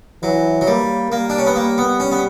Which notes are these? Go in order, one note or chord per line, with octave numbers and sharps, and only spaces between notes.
E3 F#3
F#3
G3 A#3
G3 A#3
D4
C#4
B3
A#3
B3
C#4
B3